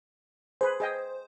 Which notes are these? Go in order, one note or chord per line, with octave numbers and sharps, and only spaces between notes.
G#4 B4 C5
G#4 D#5 G5